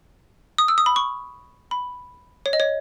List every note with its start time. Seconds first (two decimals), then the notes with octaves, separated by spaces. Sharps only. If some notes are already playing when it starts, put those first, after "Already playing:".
0.58 D#6
0.68 E6
0.78 D#6
0.86 B5
0.96 C#6
1.71 B5
2.46 C#5
2.53 D#5
2.60 C#5